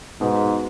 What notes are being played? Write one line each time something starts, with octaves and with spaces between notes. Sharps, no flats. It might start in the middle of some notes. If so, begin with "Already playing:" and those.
G#2 B2